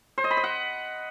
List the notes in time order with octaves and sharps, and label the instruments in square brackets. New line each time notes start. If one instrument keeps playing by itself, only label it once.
[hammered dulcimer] C5
D#5
B5
D#5
F#5